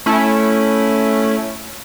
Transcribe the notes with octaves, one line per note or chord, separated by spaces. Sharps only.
A3 C#4 E4